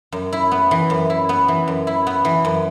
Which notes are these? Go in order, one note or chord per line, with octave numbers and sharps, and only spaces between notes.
F#2
E4
B3
E3
F#2
E4
B3
E3
F#2
E4
B3
E3
F#2